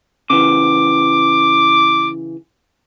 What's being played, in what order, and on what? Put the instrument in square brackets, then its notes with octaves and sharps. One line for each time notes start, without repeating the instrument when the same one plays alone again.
[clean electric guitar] C#3 E3 [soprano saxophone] D6